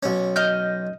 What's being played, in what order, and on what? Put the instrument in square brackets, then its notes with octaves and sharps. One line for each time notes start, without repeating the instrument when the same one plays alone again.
[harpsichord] B1 C#4
[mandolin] D#5 F6 G6